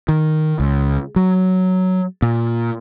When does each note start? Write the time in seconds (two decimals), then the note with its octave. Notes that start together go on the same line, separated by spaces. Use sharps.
0.09 D#3
0.60 C#2
1.16 F#3
2.22 A#2